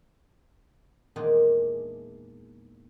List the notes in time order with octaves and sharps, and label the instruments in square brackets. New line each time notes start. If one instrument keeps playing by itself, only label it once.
[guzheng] E2 A#2 D#3 G#3 D4 D#5